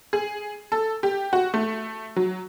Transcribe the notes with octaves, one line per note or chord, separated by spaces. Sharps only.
G#4
A4
G4
F#4
A3
F#3